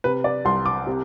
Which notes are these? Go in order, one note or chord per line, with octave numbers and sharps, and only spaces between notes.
C3 B4
D5
C2 C6
D6
C3